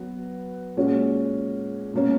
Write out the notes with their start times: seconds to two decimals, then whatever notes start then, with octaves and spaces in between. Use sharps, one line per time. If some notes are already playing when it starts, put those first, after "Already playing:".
Already playing: F#3 B3 F#4
0.77 A#2 G#3 C#4 F#4
1.94 B2 A#3 C#4